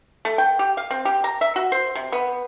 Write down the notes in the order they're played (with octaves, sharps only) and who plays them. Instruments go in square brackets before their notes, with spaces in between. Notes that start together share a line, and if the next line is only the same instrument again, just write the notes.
[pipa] A3
G5
G4
F5
C4
G4
A#5
E5
F#4
C5
C3
B3